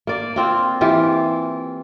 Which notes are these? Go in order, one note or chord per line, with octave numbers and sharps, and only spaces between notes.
A#3 D5
A#3 C4 F4
E3 F4 G4